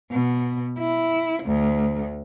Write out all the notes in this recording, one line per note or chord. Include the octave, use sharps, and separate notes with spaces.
B2
E4
D2